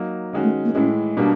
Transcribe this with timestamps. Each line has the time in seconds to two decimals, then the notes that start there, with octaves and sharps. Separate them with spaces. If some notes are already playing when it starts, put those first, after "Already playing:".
Already playing: F#3 A#3 D#4
0.33 D#3 G#3 C#4 F#4
0.43 A3
0.65 A#3
0.75 A2 E3 G#3 C#4
1.16 B2 G3 A#3 D4